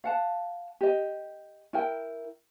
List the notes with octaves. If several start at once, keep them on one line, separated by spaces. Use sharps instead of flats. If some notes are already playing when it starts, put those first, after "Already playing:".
F5 F#5 A5
G4 D#5
E4 A#4 G5